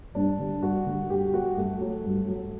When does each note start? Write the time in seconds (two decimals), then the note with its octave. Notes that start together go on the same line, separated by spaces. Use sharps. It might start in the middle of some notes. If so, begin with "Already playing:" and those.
0.15 G2 D4
0.39 D3 G3
0.62 G2 F#4
0.86 D3 G3
1.10 G2 G4
1.34 F#3 F#4
1.57 G2 A3
1.81 F#3
2.05 G2
2.28 F#3